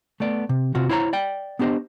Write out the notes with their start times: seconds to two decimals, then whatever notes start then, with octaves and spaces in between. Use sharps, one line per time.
0.20 A3 B3 D5
0.49 C3
0.75 C3 C4 F4 F#4
0.89 E4 C5 C#5 A#5
1.13 D5 G5
1.59 B3 D4 G4 C5 D#5